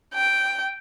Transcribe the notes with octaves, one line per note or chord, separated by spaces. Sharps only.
G5